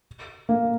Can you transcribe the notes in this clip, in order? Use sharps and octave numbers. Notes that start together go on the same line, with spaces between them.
A#3